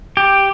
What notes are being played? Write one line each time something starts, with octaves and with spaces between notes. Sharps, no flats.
G4